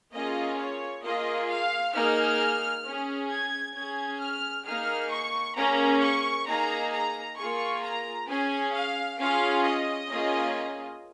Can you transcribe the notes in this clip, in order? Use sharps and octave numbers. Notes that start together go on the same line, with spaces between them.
A#3 C#4 F4 G#4 D#5
C#5
A#3 F4 G#4 D#5
F5
A#3 D#4 G#4 F6
C#4 G#4
G#6
C#4 G#4 G#6
F6
A#3 D#4 G#4 F6
C#6
A#3 C#4 G#4 A#5
C#6
A#3 D#4 G#4 A#5
A#5
A#3 F4 G#4 C#6
A#5
C#4 G#4 G#5
F5
C#4 F4 G#4 F5
D#5
A#3 C#4 F4 G#4